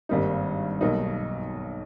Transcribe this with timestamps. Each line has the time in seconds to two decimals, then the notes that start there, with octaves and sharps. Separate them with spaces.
0.09 G#1 G2 G3 A#3 D#4
0.81 B1 B2 G3 A#3 D#4